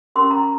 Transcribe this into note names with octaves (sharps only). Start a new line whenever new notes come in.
C#4 G4 A#4 C6
A#5